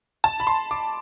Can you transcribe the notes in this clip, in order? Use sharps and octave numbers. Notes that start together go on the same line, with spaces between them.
A5
B5
C6
D6